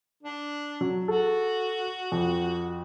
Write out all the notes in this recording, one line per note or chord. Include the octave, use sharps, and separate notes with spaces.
D4
F#3
F#4 A4
F2